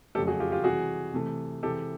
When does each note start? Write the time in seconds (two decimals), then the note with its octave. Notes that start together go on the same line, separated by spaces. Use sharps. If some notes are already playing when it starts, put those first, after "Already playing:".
0.15 F2 C#3 F#3 A3 G4 A4
0.27 F#4 G#4
0.40 F4 G4
0.52 F4 G4
0.64 C3 E3 G3 F#4 G#4
1.14 C3 E3 A3
1.63 C3 E3 G#3 G4 A4